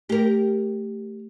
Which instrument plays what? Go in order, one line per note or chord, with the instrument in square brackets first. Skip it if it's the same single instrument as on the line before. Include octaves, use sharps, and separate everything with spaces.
[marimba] A3 [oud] G4 A#4